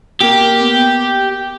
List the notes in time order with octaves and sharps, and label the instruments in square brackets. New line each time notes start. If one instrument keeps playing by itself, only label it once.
[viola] A#3 [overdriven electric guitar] G4
[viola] B3